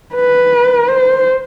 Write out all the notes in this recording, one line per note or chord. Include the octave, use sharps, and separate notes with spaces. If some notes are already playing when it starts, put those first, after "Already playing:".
B4
C5